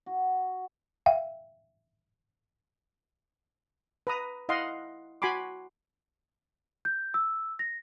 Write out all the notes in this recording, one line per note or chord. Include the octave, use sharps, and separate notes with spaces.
F#4
E5 F5 G5
B4 A#5 D#6
E4 D#5 F5 F#5 C6
F#4 G#5 B5 C6 D6
G6
E6
A#6